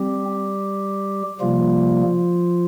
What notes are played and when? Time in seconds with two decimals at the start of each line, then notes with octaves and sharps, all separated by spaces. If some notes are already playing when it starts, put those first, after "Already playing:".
Already playing: G3 C4 G4
1.41 C3 F3 G3 A#3 F4